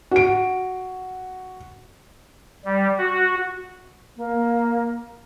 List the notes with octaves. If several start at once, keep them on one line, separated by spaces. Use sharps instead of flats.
F#4 D7
G3
F#4
A#3